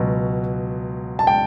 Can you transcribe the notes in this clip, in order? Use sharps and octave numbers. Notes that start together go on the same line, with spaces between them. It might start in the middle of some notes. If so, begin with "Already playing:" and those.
Already playing: C#2 B2 F#3
A5
G5